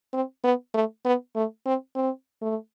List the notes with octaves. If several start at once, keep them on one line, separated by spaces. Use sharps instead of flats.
C4
B3
A3
B3
A3
C4
C4
A3